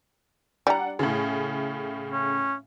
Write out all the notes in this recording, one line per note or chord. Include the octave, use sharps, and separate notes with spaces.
G3 D4 F#5 A#5
A2 C#3
C#4